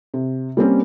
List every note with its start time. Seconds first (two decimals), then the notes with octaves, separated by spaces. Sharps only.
0.14 C3
0.57 G3 A#3 C4 C#4